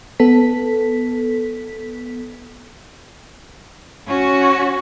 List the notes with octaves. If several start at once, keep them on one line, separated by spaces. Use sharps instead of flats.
B3 A4 B6
C#4 F#4